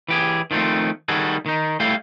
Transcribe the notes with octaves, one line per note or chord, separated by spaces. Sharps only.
E3 G4 G#4
D#3 F3 G3 A3 C4
D#3 G3 F#4 G#4 A4
D#3 D#4
G3 A3 E4 F5 G5